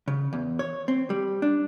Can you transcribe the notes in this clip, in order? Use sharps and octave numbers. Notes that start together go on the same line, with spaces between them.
C#3
E2
C#5
C4
G3
D4